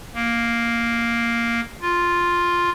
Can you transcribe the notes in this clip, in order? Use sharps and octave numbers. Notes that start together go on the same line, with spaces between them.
A#3
F4